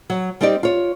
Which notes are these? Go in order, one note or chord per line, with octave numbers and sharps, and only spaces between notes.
F#3
G3 C4 D#4 G4 D5
F4 C#5